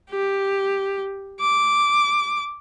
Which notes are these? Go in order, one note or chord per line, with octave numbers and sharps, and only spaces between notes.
G4
D6